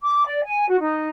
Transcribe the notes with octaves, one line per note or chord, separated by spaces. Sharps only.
D6
D5
G#5
F#4
D#4